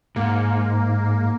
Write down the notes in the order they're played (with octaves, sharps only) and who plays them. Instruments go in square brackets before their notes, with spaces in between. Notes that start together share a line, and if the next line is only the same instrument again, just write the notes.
[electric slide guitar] G#2 [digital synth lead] A#3